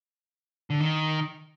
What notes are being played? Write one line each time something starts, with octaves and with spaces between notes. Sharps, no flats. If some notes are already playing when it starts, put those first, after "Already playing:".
D3
D#3